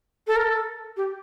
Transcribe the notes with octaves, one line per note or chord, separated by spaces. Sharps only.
A4
A#4
A4
G4